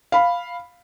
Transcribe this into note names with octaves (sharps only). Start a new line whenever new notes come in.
F5 B5